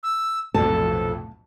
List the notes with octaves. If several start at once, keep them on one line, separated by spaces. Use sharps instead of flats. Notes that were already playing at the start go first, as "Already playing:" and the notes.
E6
B1 F2 A2 C3 A4 A5